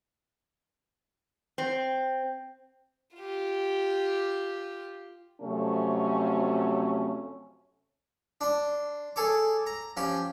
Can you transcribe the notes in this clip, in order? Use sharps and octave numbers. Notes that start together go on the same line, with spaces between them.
C4
F4 G4
F2 C3 F#3 A3 C#4
D4 C6
G#4 A4 C#5 D6
A#5
F3 C#4 G4